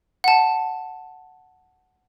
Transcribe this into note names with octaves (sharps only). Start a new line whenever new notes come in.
F#5 A5